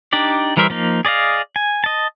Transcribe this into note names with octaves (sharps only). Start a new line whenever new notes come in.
D4 D#4 G4 D5
E3 G3 A#4 C5 E5
F3 A#3 D#4
G#4 D5 D#5 F5
G#5
D#5 A5